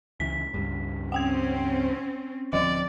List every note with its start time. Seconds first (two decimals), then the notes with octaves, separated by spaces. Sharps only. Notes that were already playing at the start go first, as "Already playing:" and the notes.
0.20 C#2 E3 B6
0.54 C#2 G2
1.12 C4 C#4 F#5 G5 G#6
2.53 D1 F3 C4 D5 D#5